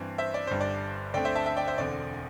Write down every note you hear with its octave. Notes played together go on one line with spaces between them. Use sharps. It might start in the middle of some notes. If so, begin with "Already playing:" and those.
Already playing: G2 E3 C4
C5 E5
D5
G1 G2 G3 C5
D5
D2 D3 A3 C4 D5 G5
C5 E5
E5 A5
E5 A5
D5 G5
C5 E5
E1 E2 D3 C4 D5